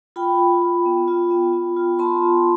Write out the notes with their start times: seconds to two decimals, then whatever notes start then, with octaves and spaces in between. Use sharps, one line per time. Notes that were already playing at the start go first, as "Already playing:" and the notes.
0.16 F4 G5 B5
0.39 F4
0.62 F4
0.86 B3
1.08 F4
1.30 B3
1.53 F4
1.76 F4
1.99 B3 A5 C6
2.22 F4